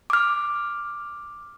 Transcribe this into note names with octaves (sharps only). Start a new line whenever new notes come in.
D6 F6